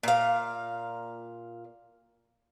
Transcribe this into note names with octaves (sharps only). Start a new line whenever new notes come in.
A#2 F5